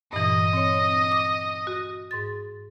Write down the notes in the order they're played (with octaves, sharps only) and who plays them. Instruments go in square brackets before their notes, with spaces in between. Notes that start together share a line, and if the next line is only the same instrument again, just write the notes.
[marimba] G2 A#2 E3 [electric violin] D#5
[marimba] C4 C#5
D6
F#4
G#2 C6 A6